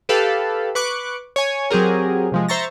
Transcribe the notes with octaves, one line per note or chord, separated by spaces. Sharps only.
G4 A4 B4 F5
B4 C#6 D6 F#6
C#5 G#5
F#3 C4 G4 G#4 A#4
C3 F3 G#3
C5 E5 A#5 C#6 A6 A#6